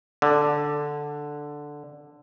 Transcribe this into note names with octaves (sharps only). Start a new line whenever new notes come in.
D3